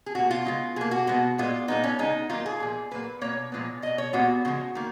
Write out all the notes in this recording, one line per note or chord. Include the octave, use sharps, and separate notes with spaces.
G#4
B2 A#3 F#4
F4
C#3 G#3 B3
B2 A#3 G#4
F#4
B2 G#3 B3
A#2 G#3 B3 F4
A#2 G#3 B3 D#4
C#4
C#3 G#3 B3 D#4
D#3 F#3 A#3 F4
G#4
A#2 F3 A#3
A#2 F#3 A#3 B4
B2 A#3 C#5
A#2 F3 G#3 B3
B2 A#3 D#5
C#5
A#2 G#3 B3 F#4
C#3 F3 G#3
D#3 A#3